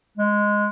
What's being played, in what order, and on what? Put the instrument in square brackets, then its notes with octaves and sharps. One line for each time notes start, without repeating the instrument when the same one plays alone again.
[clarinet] G#3